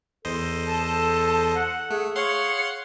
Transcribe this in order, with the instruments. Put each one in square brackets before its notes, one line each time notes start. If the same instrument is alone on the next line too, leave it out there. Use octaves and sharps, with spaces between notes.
[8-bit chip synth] E2 C5 D#5 [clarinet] A4
[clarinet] A4 [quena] A5
[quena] F#5
[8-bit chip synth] A3 [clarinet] G#4
[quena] C#5 [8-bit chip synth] F5 F#5 C6